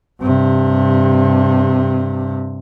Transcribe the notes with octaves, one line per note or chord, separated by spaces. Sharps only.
G2 C3